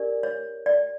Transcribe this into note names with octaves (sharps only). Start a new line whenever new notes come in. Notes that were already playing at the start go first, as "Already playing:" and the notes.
Already playing: D4 G4 A#4 D5
C#5
D5